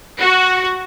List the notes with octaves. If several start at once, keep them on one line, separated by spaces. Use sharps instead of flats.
F#4